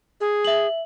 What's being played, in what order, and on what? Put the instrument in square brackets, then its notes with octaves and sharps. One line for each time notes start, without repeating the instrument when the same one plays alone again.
[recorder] G#4
[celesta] E5 F#7